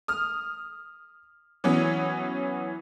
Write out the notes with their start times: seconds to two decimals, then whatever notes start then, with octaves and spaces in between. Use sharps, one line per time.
0.08 D#6 F6
1.64 E3 F#3 B3 C#4